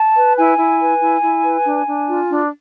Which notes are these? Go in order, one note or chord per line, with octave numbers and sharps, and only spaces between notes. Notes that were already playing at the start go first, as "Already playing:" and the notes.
Already playing: A5
B4
E4 G#5
E4
B4
E4
E4
B4
D4
D4
F4
D4